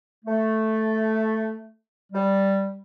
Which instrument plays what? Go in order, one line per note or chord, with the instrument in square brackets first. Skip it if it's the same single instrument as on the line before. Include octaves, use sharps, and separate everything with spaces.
[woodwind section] A3
G3